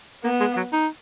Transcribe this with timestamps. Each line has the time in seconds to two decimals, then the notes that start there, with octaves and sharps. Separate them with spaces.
0.24 A#3 B3
0.41 G#3
0.57 F#3
0.73 D#4